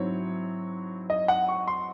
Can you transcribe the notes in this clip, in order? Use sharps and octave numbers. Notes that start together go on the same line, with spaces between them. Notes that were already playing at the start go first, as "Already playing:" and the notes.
Already playing: G#2 F#3 C4 E4 C#5
D#5
F#5
C#6
C6